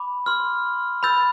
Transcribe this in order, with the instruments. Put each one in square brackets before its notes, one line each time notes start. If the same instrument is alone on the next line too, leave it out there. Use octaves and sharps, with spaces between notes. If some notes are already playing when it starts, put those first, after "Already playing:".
Already playing: [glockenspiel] B5 D6
C6 F6
B5 E6 G6 A6